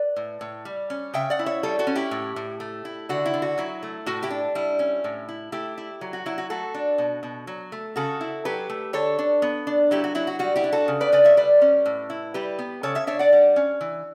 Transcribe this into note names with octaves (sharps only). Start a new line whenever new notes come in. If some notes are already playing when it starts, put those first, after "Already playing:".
Already playing: B4 D5
A2
A2
G3
C#4
C#3 E5 G5
D5 F#5
E4
C#5 E5
G3 A4 C#5
F#4 A4
C#4
E4 G4
A2
A2
A3
E4
D3 F#4
E4
D3
F#4
F#3 E4
A3
A2 F#4
E4 G4
D4
G3 E4
C#4
A2
E4
A3 E4 G4
E4
F#3
F#4
F#3 E4
F#4
A3 F#4 A4
D4
B2
B2
F#3
A3
C#3 F#4 A4
E4
F#3 G4 B4
A3
D3 A4 C#5
D4
B3
D4
F#3 E4 G4
F#4
F#3 E4
F#4
G3 F#4
E4 G4
D4
F#4 A4
C#3
B4 D5
C#3 B4 D5
C#5 E5
G3 B4 D5
C#4
A2
E4
G3 G4 B4
B3
C#3 A4 C#5
C#5 E5
D4 C#5 E5
D5 F#5
G3
C#4
E3